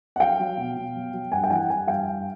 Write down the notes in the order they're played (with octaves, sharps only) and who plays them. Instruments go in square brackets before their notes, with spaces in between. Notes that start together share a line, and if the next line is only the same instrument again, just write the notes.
[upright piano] F#5
F#3 F5 G5
F#3
B2
B2
F#3
F#3
G2 F#5 G#5
G5
E3 F#5 G#5
G3 F#5 G#5
G2 F5 G5
G2